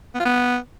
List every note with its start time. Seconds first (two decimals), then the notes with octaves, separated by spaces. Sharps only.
0.15 B3
0.20 F4
0.25 B3